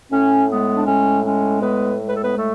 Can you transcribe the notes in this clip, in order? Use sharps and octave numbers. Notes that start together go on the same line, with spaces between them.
A2 C#4
G#3 B3
D4
A2 C#4
G#3 C#4
A2 B3 B4
G#3
B4
A4
B3 B4
A2 A3 A4